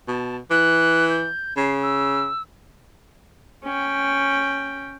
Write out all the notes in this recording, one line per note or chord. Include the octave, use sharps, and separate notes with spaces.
B2 A5
E3 F#6
G6
C#3 C7
E6
C#4 G5